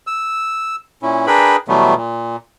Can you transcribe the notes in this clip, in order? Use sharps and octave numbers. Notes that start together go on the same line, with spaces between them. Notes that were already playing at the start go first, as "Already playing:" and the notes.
E6
A#2 C#4 E4
D4 G#4 A#4 B4 G5 B5
B2 E3 F#3 G3 A3 B3
A#2